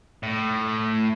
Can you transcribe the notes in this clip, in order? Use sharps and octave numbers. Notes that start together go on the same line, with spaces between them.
A2